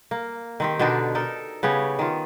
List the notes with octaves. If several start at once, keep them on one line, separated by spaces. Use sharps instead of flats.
A#3
D#3 C4 G4
B2 D3 D4 D#4
D#4 A4 A#4
C#3 B3 G4 C#5
D#3 F4